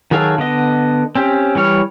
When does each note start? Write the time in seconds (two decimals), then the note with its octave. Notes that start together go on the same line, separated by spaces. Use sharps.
0.11 D#3 F#3 G#4 A4 F5
0.38 D3 B3 D#5
1.15 C4 C#4 G4
1.55 E3 G3 C#5 F6